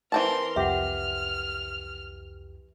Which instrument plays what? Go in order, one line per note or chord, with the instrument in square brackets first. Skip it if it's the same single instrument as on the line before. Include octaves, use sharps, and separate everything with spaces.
[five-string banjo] E3 C4 A5 [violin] A#4 C6
[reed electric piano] C2 F2 G4 [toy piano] E5 F#5 [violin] F6